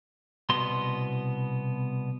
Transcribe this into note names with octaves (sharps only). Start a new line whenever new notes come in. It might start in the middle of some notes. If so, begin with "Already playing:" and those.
C2 B2 B3 C6